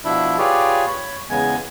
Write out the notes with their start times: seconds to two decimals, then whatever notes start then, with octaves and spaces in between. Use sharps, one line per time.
0.05 B2 F3 D4 E4 E5 B5
0.38 F4 G4 G#4 B4 C#5 D5
0.88 C#5 B5
1.30 E2 C#3 G#3 B3 G#5